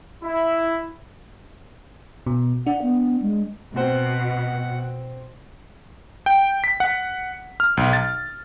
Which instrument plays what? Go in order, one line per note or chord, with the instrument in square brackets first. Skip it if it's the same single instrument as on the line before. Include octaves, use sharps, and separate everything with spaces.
[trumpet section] E4
[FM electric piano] B2
[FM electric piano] D4 [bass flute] F#5
[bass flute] B3
G#3
[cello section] B2 [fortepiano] C4 C5 [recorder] F#5
[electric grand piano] G5
B6
F#5
F6
B1
A6